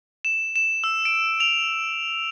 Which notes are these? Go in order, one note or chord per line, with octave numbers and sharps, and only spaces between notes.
E7
E7
E6
D7
F7